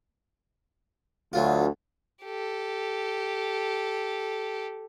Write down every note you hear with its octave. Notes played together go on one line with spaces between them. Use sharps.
D2 F#3 F4
G4 A4